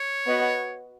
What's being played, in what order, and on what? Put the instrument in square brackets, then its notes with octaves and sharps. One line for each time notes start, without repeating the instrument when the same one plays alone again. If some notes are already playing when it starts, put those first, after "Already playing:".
Already playing: [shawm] C#5
[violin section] B3 F#4 B4 D#5 F#5